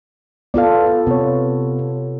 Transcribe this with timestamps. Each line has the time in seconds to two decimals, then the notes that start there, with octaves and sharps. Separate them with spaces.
0.54 B3 F4 A4 D5 F5
1.07 C3 B3 C#5